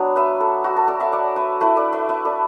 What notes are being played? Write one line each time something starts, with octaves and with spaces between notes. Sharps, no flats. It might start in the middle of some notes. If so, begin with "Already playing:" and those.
Already playing: F#3 B3 D4
B4 E5
A4
F#4
A4
A4 D5
E5 A5
D5 F#5
B4 E5
A3 E4 B4 E5
A4 D5
B4 E5
B4 E5
A4 D5